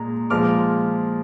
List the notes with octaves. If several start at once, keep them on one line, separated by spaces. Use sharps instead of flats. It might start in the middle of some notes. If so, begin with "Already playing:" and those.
Already playing: A#2 G#3 A#5
A#2 F3 G#3 D6 F6